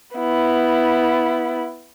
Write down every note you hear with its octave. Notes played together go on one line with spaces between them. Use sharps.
B3 E4